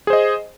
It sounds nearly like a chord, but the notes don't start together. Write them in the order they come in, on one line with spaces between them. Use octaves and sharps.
G#4 C5 D#5